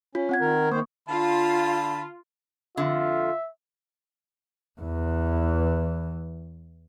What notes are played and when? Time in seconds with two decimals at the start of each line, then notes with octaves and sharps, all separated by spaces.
0.15 C#4 F4
0.29 C4 F#5 G#6
0.41 D#3 A#4
0.71 D#3 A#3 C5 C#6
1.09 D3 F4 A5 B5
2.77 F2 D3 F4 E5
4.81 E2 E3